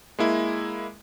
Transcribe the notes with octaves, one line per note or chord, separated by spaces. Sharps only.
G#3 A#3 E4